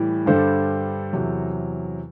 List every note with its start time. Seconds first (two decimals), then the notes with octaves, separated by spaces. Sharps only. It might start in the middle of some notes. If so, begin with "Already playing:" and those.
Already playing: A2 E3 G3
0.26 G2 D3 G3 A4 C5
1.13 E2 C3 F#3